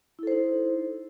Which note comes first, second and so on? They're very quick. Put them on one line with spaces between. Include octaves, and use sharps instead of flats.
E4 A4 C5 D#4